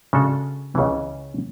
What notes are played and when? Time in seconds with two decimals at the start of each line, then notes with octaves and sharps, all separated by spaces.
0.13 C#3 G#3 D4 F#4 A4
0.75 C#2 C#3 E3